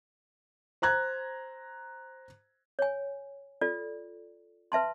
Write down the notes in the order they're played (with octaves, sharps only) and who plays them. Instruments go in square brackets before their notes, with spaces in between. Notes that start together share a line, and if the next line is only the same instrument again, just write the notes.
[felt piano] C5 A#5 F#6 G#6
[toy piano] C#5 G#5
F4 A4 D5
B4 E5 A5 C6